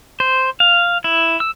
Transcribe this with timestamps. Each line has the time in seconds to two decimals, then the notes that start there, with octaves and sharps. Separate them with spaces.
0.20 C5
0.60 F5
1.04 E4
1.40 E6